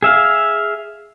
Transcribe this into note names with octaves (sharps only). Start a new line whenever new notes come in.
G#4 E5 F5